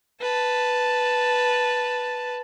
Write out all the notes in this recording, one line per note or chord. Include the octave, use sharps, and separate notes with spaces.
B4 A5